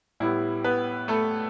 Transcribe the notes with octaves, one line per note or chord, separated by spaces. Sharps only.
A2 G3 B3 E4
B3 B4
A3 A4